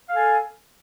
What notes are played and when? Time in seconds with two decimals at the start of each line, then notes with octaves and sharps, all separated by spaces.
0.09 F5
0.13 A4
0.16 G#5